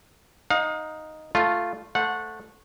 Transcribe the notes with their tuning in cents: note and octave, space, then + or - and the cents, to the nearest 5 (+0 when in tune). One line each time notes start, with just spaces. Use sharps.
D#4 +0 F5 +35
A3 +0 F4 +0
A3 +0 C5 +0 F#5 -20